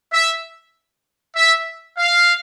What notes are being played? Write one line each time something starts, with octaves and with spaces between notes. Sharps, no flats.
E5
E5
F5